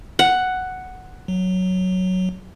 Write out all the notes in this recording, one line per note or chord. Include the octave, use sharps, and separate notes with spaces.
F#5
F#3